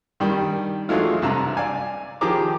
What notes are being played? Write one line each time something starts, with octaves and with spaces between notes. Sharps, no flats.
G2 D#3 G3
E3 F#3 G#3 A3 F4
C2 G2 C3 A5 A#5
D5 F5 G#5
D#3 F3 G4 G#4 A#5 D6